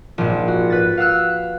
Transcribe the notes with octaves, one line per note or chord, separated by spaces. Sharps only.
A#1 G#2
F#4
B4 A6
F5 F#5 E6 F#6